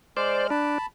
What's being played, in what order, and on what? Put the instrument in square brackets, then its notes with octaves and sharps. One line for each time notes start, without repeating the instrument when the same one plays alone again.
[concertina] G#3 F6 [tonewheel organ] C5 D5
[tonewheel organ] D4 [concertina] A5 B5